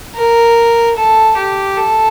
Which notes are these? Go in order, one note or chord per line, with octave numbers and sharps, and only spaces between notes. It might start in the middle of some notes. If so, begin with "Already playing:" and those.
A#4
A4
G4
A4